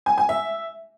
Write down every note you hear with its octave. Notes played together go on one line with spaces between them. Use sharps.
G#5
G#5
E5